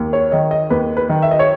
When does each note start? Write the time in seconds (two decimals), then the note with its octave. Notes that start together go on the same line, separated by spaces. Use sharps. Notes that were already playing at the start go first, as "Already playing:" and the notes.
Already playing: D#2
0.13 C#5
0.32 D#3 D#5
0.51 D#5
0.70 D#2 B4
0.97 B4
1.09 D#3
1.22 E5
1.31 D#5
1.39 C#5